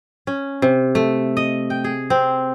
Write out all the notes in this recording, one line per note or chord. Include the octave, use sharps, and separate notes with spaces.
C#4
C3
A3
D#5
G5
G#4
C4